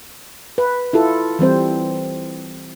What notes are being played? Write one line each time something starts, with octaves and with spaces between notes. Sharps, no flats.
B4
E4 F4 A4
E3 G3 C4 C5